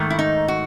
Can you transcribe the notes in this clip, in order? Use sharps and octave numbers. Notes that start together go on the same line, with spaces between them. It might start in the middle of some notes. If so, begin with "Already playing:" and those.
Already playing: G#2 D#3 A3
E4
D#4
F#4